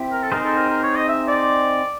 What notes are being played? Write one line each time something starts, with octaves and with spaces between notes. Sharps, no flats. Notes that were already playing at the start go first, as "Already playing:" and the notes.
Already playing: C4 E4 G4
A#4
A4
C4 D#4 G#4 A#4 C5
A4
A#4
A#4
C#5
D#5
E5
D5